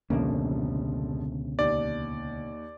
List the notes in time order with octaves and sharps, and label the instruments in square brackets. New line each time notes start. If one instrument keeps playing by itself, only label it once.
[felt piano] F1 F3 [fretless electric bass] C#2 A#3 [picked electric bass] B2 D3 C#4
[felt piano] D#2 [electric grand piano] D5